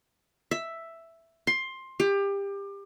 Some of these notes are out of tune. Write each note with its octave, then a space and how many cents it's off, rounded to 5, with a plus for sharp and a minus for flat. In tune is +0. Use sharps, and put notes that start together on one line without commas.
E5 +5
C6 +15
G4 +25